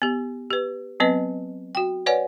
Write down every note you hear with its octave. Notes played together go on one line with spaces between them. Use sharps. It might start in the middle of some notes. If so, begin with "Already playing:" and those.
B3 G4
G4 B4
F#3 B3 C4 B4 D#5
F#4 G5
B4 C#5 D5 F#5 G#5